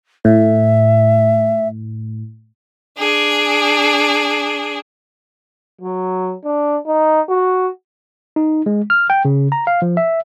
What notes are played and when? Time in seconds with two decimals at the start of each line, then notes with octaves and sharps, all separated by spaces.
0.25 A2 E5
2.98 D4 G#4
5.81 F#3
6.45 D4
6.86 D#4
7.29 F#4
8.36 D#4
8.66 G#3
8.90 F6
9.10 G5
9.25 C#3
9.52 A#5
9.67 F5
9.82 F3
9.97 E5